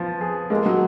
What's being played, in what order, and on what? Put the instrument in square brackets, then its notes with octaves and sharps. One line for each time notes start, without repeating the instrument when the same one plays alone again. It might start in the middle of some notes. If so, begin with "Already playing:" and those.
Already playing: [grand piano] F3 B3
G#4
[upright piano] G#3 [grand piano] A#3
[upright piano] F#3